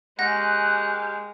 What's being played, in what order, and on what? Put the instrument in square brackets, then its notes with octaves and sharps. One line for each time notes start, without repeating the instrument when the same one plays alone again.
[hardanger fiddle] G#3 [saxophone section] A#3 C#4 G4 [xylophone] F#5 A#6 [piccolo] F#6